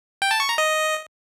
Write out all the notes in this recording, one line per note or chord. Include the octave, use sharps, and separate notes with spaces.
G5
A5
C#6
A#5
D#5